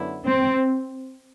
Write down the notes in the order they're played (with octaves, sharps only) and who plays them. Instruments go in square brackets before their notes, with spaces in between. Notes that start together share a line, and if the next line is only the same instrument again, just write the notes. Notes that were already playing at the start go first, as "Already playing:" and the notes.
Already playing: [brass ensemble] F#2 D3 F#3 B3 E4
[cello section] C4